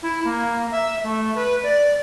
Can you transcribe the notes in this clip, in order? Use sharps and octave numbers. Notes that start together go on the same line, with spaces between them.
E4
A#3
E5
A3
B4
D5